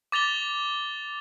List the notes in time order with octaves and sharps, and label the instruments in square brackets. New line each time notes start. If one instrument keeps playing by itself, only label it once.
[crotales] D6 A6 F7 G7